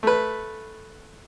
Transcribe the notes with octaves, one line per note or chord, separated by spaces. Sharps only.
A3 B4